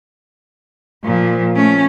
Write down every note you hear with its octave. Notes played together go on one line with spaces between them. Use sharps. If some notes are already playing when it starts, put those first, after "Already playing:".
A#2 F3
A3 C#4